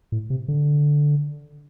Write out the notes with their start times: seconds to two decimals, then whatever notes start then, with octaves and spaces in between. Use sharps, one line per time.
0.12 A2
0.30 C3
0.48 D3